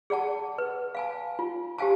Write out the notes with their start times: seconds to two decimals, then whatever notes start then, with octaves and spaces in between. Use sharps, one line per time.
0.10 G#4 D5 F#5 A5
0.58 B4
0.95 F5 G#5 A5
1.39 F4
1.78 G4 C5 F5 G#5 A5